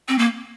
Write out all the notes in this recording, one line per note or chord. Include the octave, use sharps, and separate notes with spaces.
C4
A#3